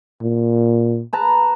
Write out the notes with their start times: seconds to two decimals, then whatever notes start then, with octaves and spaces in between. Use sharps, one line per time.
0.21 A#2
1.13 B4 A5 A#5